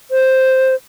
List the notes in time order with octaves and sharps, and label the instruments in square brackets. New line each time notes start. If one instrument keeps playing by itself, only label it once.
[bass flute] C5